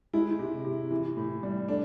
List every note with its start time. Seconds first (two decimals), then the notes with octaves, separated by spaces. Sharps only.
0.13 G#3 E4
0.39 C3
0.65 C3
0.91 E3
1.17 A2
1.43 G3
1.68 A3 D4